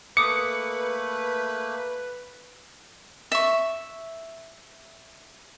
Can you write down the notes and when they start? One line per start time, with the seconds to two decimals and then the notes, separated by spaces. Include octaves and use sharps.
0.17 A3 A#3 B4 D6 D#6 C#7
3.32 E5 C#6